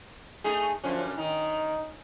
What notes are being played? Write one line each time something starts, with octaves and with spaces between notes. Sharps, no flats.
A3 D#4 G#4
F#2 D3 F3 C#4
D#3 D#4